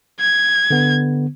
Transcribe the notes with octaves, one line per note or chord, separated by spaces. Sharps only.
G#6
D3 B3